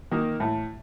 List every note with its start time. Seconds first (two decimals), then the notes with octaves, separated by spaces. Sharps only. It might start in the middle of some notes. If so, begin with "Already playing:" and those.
0.12 D#3 A#3
0.40 A2